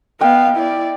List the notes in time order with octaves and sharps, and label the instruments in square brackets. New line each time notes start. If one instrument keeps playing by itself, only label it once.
[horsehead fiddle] B3 F5 [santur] D#5 G5
[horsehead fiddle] E4 D5